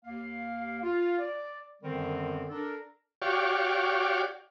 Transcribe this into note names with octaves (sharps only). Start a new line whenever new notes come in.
D#2 A#3 F5
F4
D5
F#2 D3 D#3 G3 B3 C4
D4 A4 A#4
F#4 G4 C#5 D5 F5